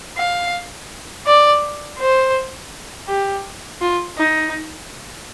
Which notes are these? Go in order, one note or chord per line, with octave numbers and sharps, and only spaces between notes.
F5
D5
C5
G4
F4
D#4